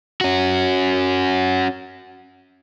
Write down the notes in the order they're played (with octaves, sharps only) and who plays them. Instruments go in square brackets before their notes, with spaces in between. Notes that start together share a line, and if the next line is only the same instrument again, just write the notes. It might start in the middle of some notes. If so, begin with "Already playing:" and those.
[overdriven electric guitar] C#4 F#4